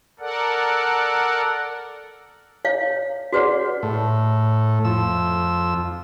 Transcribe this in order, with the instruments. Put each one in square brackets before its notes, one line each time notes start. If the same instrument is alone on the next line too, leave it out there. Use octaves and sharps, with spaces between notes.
[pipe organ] A4 A#4 D5 F#5
[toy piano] C#5 F5
F#4 G#4 B4 C#5 D5 F#5
[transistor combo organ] A2
F2 E6